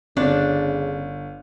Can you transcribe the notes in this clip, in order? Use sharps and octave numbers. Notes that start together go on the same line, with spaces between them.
G1 C#3 D4